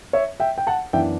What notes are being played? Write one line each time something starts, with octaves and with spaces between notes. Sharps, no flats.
C#5 E5
E5 G5
G5
F#5 A5
F#2 E3 B3 D4 E5 G5